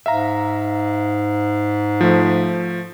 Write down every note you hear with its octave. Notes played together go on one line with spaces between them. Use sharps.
G#2 E5 F5 A#5
F3 A3